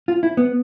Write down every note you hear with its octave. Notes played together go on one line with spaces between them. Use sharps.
F4
E4
B3